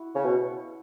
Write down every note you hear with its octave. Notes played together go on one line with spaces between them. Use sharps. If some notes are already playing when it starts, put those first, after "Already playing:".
Already playing: E4 F#4
C#3 C#5
B2